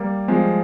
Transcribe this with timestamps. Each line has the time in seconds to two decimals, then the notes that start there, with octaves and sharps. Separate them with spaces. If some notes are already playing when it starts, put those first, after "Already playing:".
Already playing: G3 A#3
0.28 F3 G#3